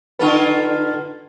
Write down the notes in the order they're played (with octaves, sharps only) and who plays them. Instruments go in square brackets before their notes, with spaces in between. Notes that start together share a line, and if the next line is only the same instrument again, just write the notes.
[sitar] D3 F4 A4 [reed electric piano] D#4 B4